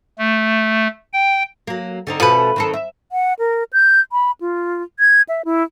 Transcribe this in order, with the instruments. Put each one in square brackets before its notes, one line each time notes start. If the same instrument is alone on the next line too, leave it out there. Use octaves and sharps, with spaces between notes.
[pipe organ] A3
G5
[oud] F#3 A#3
D3 C4 D#4
[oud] B2 A3 C#4 [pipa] F3 B4
[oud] D#3 C4 A4
E5
[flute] F#5
A#4
G6
B5
F4
G#6
E5
E4